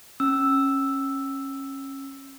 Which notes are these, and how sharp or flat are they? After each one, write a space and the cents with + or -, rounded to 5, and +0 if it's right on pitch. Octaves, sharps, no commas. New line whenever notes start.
C#4 -20 E6 +0